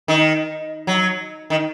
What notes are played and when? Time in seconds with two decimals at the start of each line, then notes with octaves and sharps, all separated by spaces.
0.08 D#3
0.87 F#3
1.50 D#3